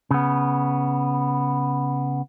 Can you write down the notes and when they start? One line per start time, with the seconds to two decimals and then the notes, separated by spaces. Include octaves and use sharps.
0.11 C#3 B3